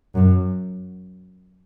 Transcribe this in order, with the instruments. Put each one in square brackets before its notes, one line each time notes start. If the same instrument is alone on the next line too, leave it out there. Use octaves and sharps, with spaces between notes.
[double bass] F#2